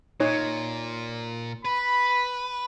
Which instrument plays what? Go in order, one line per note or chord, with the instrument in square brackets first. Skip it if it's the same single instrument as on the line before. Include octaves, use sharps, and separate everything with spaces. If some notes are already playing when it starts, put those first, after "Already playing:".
[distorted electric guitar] A#2 [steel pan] D#4 C#5
[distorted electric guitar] B4 [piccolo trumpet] B5